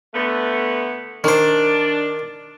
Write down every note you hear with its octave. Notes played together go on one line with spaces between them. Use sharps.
D3 A3 B3
D#3 D4 C5